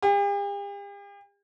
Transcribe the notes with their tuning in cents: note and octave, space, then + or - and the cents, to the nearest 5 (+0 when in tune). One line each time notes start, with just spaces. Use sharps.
G4 +45